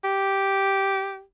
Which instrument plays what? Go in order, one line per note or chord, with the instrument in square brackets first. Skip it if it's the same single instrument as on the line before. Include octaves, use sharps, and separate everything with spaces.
[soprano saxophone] G4